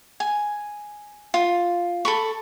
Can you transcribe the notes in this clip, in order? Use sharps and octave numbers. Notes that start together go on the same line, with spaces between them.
G#5
F4
A4 B5 C#6